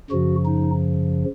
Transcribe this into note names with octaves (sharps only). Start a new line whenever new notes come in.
F#2 C#3 F3 F#4
D#4